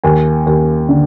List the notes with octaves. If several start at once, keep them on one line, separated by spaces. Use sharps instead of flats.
D#2 G#5
D#2
D3